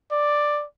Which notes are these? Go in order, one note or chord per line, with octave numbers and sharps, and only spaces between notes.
D5